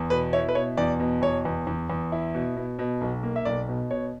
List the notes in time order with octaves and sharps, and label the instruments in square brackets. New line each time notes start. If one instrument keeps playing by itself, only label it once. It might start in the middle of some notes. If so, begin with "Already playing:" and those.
Already playing: [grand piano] E2
B2 B4
E4 C#5
B4
B2 C#5
E2 D5
B2
E2 C#5
E2
E2
E2
E4
B2
B2
B2
B1
A#3
E5
B1 D5
B2
B2 C#5